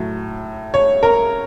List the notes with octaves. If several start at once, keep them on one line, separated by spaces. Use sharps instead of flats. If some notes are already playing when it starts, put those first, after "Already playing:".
Already playing: A2 F#3
C#5
A#4